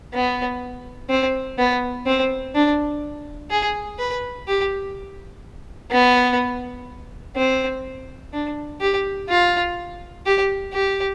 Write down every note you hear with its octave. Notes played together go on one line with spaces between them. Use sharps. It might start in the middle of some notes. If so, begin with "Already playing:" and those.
B3
C4
B3
C4
D4
G#4
B4
G4
B3
C4
D4
G4
F4
G4
G4